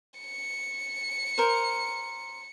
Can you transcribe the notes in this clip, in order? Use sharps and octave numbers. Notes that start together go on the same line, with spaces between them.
C#7
A#4 C5